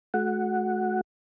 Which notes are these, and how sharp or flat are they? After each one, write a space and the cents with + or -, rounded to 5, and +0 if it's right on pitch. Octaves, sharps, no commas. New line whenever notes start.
A3 -45 F#4 -15 F#5 +0